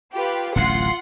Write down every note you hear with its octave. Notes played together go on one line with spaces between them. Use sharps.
F4 G4 B4
D1 A1 F#2 F4 F#5 C6